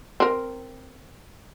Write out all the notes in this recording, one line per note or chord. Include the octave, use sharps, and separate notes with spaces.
C4 A#4